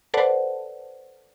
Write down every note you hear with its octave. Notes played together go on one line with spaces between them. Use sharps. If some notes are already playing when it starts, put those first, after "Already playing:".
A4 B4 C5 D5 F#5 A5